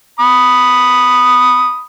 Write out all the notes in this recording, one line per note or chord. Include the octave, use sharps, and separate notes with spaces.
B5 D#6